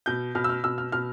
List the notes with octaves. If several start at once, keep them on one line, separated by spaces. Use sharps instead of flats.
B2 G6
B2 F6
E6
F6
B2 E6
F6
B2 F6